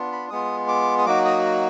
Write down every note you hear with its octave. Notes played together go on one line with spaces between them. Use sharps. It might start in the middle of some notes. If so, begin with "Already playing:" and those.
Already playing: B3 D4 F4
B5
G#3 B3 F4 D#6
D6
D#6
F#3 A#3 D#4 F#4 D6
D#6